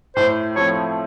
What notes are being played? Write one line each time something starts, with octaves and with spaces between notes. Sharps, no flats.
A2 C5
F3 A3 C4 C#5